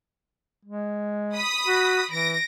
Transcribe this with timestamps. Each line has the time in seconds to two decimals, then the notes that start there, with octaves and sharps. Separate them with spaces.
0.65 G#3
1.35 B5 D#6 B6
1.67 F#4
2.11 E3 A#6 D7